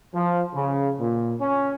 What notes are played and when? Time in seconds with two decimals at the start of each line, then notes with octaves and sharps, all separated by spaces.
0.15 F3
0.55 C#3
1.00 A#2
1.41 C#4